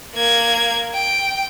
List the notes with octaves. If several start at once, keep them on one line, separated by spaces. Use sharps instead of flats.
A#3 G#6
G5